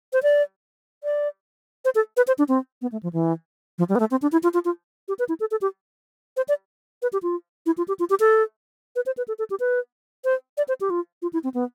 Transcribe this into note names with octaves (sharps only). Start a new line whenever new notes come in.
C5
D5
D5
C5
A4
B4
C5
D4
C4
B3
A3
F3
E3
F3
G3
B3
A3
C4
D4
E4
F4
F4
F4
G4
B4
E4
A4
A4
G4
C5
D5
B4
G4
F4
E4
F4
G4
F4
G4
A4
B4
C5
B4
A4
A4
G4
B4
C5
D5
C5
G4
F4
F4
E4
C4
B3